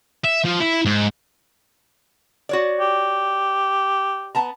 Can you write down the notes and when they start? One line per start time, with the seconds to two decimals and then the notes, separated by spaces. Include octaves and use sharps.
0.24 E5
0.44 F3
0.60 E4
0.85 G#2
2.49 F#4 C#5 D5
2.81 G4
4.35 B3 A5 A#5